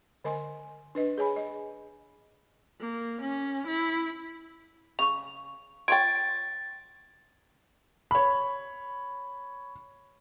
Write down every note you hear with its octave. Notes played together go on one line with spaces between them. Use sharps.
D3 A#4 D#5 G#5 C6
D4 B4 D#5
G#4 C#5 G#5 B5
D#5
A#3
C#4
E4
C#3 C#6 F7
F4 C#5 G5 G#6 A6 D7
C#5 B5